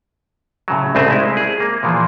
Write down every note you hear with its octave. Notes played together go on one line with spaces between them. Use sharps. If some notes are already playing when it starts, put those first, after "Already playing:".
A2 C#3 F#3
C2 C#3 A3 C4 D#5 E5
G#3 E4
G#4
A#3
A#2 E3 F3